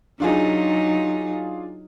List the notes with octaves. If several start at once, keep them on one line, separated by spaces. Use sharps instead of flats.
F#3 D4 D#4 F4 G#4